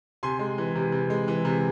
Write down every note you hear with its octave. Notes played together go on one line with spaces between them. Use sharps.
C3 G#5 C6
G#3
E3
C3
C3
G#3
E3
C3